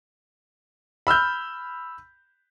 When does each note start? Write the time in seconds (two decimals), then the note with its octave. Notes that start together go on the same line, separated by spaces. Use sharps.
1.07 B5 E6 F6 G6